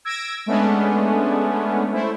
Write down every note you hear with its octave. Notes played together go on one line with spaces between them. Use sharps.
E6 G#6 A#6 D7
G#3 A3 B3 C#4 D4
A3 E4 C5